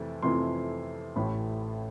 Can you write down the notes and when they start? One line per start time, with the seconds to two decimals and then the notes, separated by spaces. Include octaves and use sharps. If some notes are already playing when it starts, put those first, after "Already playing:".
Already playing: F2 C3 E3 A3
0.22 F2 C3 E3 A3 C6
1.16 A1 A2 E3 A3 B5